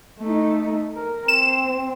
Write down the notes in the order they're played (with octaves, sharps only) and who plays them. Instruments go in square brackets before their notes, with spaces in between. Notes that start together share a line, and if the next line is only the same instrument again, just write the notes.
[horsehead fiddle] A3 D#4
A#4
[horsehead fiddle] C4 [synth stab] E7